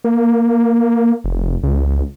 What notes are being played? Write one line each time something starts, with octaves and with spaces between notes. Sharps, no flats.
A#3
F1
C#2